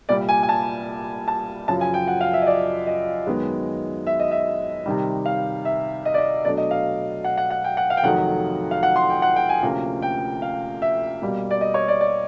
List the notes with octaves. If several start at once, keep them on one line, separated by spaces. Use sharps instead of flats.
C2 A#2 G3 D5
G#5
G#5
A5
A5
F#2 C#3 F3 A5
G#5
G5
F#5
F5
E5
D#5
D5
D#5
F#2 D#3 G#3 B3
E5
D#5
E5
C3 D#3 G3
F5
E5
D#5
D5
D#5
B2 F#3 A3 D4 D5
D#5
F5
F#5
F#5
F#5
G5
F#5
F5
G5
F2 C3 D#3 F#3 A3 F#5
F5
F#5
C6
G5
F#5
G5
G#5
D2 C3 F3 A#3 C#4
G5
F5
E5
B2 G3 A#3
D5
D#5
C#5
D5
D5